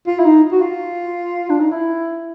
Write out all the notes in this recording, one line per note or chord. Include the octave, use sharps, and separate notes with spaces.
F4
E4
D#4
F#4
F4
D4
D#4
E4